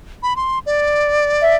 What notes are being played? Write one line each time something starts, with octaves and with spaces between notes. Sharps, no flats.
B5
C6
D5
E5